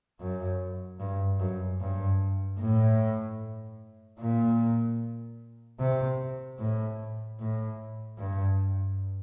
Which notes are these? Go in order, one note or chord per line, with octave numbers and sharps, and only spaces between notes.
F#2
G2
F#2
G2
A2
A#2
C3
A2
A2
G2